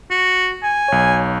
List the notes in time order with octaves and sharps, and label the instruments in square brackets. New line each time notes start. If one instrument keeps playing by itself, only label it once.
[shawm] F#4
G#5
[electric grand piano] B1 C#5